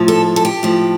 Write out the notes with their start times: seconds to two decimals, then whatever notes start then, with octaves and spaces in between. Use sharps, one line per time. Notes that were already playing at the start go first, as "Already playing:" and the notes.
Already playing: A2 F3
0.08 A4
0.36 A4
0.45 G4
0.63 A2 F3